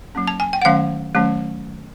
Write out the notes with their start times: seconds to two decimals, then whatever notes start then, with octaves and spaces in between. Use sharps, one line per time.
0.15 F#3 A#3 C#4
0.28 A5
0.40 G#5
0.53 G5
0.62 F#5
0.65 D#3 F#3 A3 C#4 F5
1.15 D#3 F#3 A3 C#4